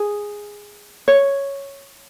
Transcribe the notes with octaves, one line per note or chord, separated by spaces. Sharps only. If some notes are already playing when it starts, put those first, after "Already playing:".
Already playing: G#4
C#5